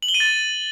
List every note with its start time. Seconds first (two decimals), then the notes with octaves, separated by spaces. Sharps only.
0.03 F#7
0.08 G7
0.14 D#7
0.20 A6